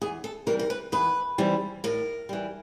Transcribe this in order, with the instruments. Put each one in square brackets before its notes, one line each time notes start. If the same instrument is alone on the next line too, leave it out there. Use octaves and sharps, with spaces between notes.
[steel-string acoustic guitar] E2 G#4
A4
C3 E3 G3 A#4
A#4
B4
E2 B4
C3 E3 G3
A2 A#4
E3 G3